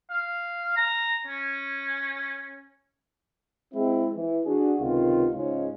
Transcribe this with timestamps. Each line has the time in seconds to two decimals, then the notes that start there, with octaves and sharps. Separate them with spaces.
0.10 F5
0.76 A#5
1.27 C#4
3.74 G#3 C4 E4
4.14 E3
4.45 D4 F#4 G#4
4.80 C#2 C3 D#3 B3 F4
5.34 G#2 C#3 G#3 C#4 D#4 F4